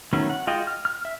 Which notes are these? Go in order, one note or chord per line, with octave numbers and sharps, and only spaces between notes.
D#3 F#3 A3 B3 C#4
F#5
G#3 F4 F#4 D#5 G5
F6
F6
E5